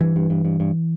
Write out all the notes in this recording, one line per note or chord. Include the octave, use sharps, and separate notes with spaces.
G2 E3
G2
G2
G2
G2